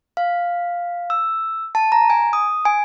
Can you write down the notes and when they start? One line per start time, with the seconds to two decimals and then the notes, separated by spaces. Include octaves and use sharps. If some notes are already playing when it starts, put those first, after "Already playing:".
0.17 F5
1.10 E6
1.75 A5
1.92 A#5
2.10 G#5
2.33 D#6
2.65 G#5